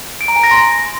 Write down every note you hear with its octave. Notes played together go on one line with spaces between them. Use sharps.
D7
A#5
G#5
A#6
C6